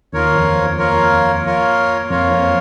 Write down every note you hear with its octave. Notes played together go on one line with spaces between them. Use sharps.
D#2 D#3 A#3 F4 A#4 C#5
F2 F3
A#3 F4 A#4 C#5
A#3 F4 A#4 C#5
F2 F3 A#3 F4 A#4 C#5
F2 F3